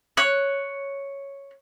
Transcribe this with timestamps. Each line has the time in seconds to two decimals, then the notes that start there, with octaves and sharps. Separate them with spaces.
0.17 C#5 F#6